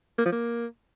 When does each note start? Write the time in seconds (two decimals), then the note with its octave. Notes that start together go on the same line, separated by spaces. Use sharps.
0.18 A#3
0.25 F3
0.32 A#3